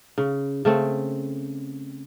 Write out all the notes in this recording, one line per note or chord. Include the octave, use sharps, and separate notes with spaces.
C#3
C#3 A3 C4